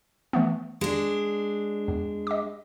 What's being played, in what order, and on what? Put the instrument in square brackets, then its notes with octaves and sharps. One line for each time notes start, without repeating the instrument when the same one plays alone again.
[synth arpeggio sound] E3 A3 B3
[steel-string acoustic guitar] G#3 D4
[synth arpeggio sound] E2
D#5 D6